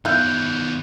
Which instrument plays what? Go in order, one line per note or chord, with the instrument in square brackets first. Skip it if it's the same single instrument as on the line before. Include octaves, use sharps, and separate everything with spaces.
[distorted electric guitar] D#3 B3 [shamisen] E4 F4 [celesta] F#6 G6